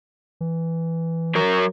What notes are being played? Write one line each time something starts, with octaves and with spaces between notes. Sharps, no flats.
E3
F#3 A#4